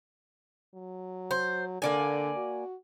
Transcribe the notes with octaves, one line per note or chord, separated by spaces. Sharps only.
F#3
C5
D3 A#3 D5 G#5
F#4